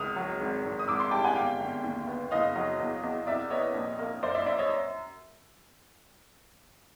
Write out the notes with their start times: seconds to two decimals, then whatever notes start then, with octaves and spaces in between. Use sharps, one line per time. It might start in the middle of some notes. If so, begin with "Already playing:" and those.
Already playing: G#1 C#2 D#6 F6
0.16 F#3
0.41 G#1
0.65 G#1
0.79 D#6
0.88 G#1 D6 E6
1.00 C6 D6
1.11 G3 G5 A5
1.24 F#5 G#5
1.35 G1 F5 G5
1.60 G1
1.84 D#2
2.07 B3
2.31 F#1 D#5 F5
2.56 F#3
2.79 E2
3.03 E2
3.27 C2 D5 E5
3.50 B3 C#5 D#5
3.74 A#1
3.99 A#3
4.23 F#2 C5 D5
4.35 D5 E5
4.46 F#2 D5 E5
4.58 C#5 D#5